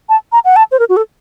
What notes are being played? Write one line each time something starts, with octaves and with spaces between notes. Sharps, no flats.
A5
A#5
F#5
A5
C5
A#4
F#4
A4